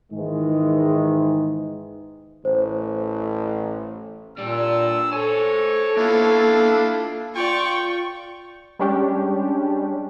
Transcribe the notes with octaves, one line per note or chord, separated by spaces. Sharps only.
G#2 D#3 E3 G#3
A1 C5
A#2 D4 G4 E6
A4 C5 C#5 G#5
A#3 B3 D4 E4 F4
F4 D5 G5 C#6
G3 G#3 C#4 D4 G4